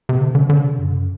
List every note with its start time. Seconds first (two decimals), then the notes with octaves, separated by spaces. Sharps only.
0.09 C3
0.21 D3
0.35 D3
0.50 D3
0.64 C3
0.79 F#2